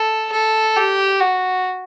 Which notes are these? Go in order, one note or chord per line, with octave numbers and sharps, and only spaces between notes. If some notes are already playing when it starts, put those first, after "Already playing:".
Already playing: A4
A4
G4
F#4